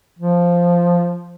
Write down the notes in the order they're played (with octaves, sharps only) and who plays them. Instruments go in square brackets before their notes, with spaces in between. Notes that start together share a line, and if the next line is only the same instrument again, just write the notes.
[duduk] F3